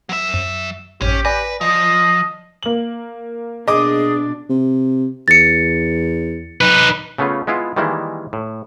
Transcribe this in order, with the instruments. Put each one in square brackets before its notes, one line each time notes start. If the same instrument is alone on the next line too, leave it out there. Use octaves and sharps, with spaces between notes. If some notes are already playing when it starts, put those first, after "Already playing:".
[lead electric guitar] F#3 E5
[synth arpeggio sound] F#2
[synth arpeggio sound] A1 F#2 [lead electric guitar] C#4 C#5 [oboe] G4
[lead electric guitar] B4 [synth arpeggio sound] D5 G#5 A#6
[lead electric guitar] F3 [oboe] D#5
[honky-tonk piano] A#3 F#7
[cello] B2 D4 [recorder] G#4 [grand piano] D#5 D6
[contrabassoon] C3
[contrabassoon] E2 [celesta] A6 C#7
[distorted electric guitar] D#4 B4
[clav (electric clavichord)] C#3 A3 B3 C#4 F4
G#3 B3 E4 F4
D#3 E3 G3 G#3 A#3 E4
A2